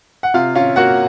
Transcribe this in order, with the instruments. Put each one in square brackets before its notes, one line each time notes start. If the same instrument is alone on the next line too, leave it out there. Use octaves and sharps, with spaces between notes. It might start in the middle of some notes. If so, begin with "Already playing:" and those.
[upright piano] F#5
C3 F4 F5
C#4 F4 F5
A#3 F#4 F#5